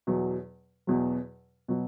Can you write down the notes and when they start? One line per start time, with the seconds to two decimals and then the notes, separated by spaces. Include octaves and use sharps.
0.07 E2 B2 F#3
0.87 E2 B2 F#3
1.68 B2 F#3